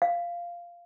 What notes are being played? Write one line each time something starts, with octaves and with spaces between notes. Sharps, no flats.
F5